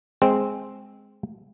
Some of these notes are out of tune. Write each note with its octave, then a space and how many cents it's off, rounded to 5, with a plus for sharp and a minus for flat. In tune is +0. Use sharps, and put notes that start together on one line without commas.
G#3 +0 C4 +0